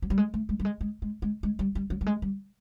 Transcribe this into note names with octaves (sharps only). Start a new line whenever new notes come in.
F#3
G3
G#3
A3
G#3
G3
G#3
G#3
G#3
G#3
G#3
G3
G3
F#3
G3
G#3
G3